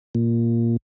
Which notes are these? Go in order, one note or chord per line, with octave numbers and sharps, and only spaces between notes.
A#2